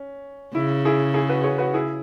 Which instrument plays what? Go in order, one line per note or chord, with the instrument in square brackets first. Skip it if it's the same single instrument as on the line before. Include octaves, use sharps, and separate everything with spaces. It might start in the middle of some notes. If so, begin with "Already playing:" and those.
Already playing: [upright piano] C#4
[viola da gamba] C#3 [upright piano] E4
[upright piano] E4 G#4
E4 G#4
F#4 B4
G#4 C#5
F#4 B4
E4 G#4